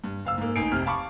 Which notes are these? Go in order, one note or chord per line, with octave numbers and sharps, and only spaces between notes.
G2
F#1 F5 E6
G#2 A#3
A1 D#4 G#5 C7 D7
F1 C3 F6
F5 A5 B5 C#6 D6